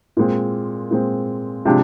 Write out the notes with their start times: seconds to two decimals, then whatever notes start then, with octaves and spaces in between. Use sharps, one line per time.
0.17 A#2 G#3 C4
0.91 A#2 G#3 C4
1.65 C3 F3 G#3 D4 G4